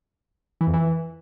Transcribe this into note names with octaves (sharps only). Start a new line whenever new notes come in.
E3
F2
E3